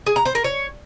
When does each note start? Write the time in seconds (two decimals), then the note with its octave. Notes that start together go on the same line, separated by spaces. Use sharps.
0.06 G#4
0.16 A#5
0.25 C5
0.35 A#4
0.44 C#5